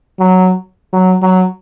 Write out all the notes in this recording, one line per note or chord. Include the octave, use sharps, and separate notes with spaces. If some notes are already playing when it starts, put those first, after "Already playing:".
F#3
F#3
F#3